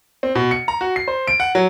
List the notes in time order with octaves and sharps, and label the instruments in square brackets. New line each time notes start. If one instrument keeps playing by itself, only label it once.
[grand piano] C4
B2
C#7
A#5
F#4
C7
C5
D7
F#5
F#3